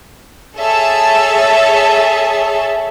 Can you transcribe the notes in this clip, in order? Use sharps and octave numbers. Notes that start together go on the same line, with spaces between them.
G#4 A4 C#5 E5 A5